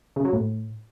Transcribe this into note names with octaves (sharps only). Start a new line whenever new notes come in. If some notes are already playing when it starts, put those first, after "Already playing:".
C#3
F#3
A2